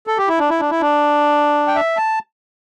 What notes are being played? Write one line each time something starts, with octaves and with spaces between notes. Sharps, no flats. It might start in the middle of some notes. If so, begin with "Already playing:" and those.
A4
G4
E4
D4
E4
D4
E4
D4
G5
E5
A5